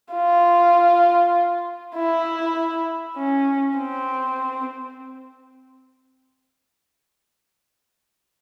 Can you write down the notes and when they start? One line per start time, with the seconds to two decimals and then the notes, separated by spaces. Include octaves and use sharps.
0.13 F4
1.96 E4
3.17 C#4
3.78 C4